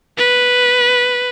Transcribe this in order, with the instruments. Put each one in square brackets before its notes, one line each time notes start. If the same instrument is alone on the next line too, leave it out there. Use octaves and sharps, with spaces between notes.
[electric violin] B4